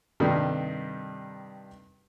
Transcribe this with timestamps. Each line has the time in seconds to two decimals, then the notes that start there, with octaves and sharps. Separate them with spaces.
0.20 G2 C3 D#3 G3 A3 D#4